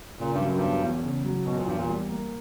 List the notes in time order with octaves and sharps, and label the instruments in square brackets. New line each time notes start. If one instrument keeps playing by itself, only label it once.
[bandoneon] A#2 [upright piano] C#3
[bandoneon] G2
[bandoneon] F#2 [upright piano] F#3
[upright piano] E1 [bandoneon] G2
[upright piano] E2
C#3
F#3
[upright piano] E1 [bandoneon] B2
[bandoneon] A#2
[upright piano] E2 [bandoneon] G2
[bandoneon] A#2
[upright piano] G3
A#3